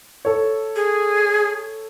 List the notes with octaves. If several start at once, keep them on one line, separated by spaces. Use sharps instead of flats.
A4 C#5
G#4